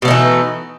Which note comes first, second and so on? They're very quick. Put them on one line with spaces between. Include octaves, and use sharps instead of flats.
B2 A3 D#4 E3